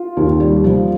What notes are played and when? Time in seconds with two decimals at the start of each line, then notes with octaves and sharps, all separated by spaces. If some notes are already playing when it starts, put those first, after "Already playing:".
Already playing: F4
0.17 D#2
0.40 G3
0.64 F3